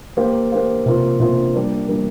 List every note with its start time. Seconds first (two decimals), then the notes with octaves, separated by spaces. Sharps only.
0.17 A#3 G4 C5 F5
0.52 A#3 G4 C5 F5
0.86 C3 A#3 F4 C5
1.20 C3 A#3 F4 C5
1.54 G3 A#3 D4
1.88 G3 A#3 D4